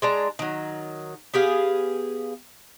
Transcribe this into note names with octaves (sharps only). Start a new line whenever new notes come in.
G#3 D4 A#5
D#3 F#3
B3 G4 G#4 F5